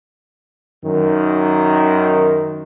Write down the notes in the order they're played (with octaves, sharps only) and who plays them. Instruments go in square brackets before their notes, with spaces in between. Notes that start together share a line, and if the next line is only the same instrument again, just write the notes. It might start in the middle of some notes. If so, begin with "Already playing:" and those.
[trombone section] F#2 D#3